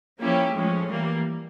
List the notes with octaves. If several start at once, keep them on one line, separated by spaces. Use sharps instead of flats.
F3 A#3 C#4 E4 G4
A2 F3 G#3 C#4
E3 G3 A#3